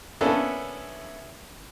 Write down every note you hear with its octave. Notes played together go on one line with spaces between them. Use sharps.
A#3 B3 C#4 D4 E4 A4